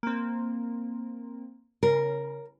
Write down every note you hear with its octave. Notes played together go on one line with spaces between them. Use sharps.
A#3 C4
C#3 A#4